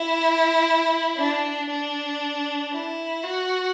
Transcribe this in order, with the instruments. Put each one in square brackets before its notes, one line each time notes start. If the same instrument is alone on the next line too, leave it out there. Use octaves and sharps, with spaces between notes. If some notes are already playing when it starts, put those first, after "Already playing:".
Already playing: [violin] E4
D4
D4
E4
F#4